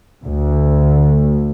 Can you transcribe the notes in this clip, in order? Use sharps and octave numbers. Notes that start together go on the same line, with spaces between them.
D2